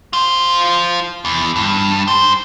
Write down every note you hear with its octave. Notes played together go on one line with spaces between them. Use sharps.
F4 C5
E2
G2
G#2 C5